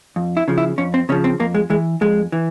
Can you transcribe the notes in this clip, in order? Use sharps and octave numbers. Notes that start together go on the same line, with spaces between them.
F2
E4
C#3 F3
E4
F2 C#4
C4
C#3 F3 C#4
C4
F2 A#3
G#3
E3 G#3
F2 G#3
E3